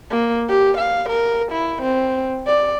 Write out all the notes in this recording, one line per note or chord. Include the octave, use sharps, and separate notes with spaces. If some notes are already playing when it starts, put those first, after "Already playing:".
A#3
G4
F5
A#4
E4
C4
D5